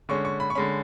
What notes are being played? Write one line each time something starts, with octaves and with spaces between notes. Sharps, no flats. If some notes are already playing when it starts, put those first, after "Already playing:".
D3 G#3 C#4 C#6
C#6
B5
C#6
D3 G#3 C#4 B5